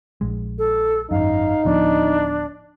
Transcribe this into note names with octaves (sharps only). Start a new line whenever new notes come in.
A#1 G#3
A4
G#1 F#2 D#4 F5
D1 F3 B3 D4